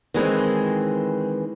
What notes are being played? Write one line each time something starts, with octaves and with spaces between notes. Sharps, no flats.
D#3 E3 G#3 C4